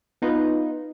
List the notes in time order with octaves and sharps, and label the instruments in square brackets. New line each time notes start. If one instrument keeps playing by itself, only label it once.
[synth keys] B3 D#4 F4 B4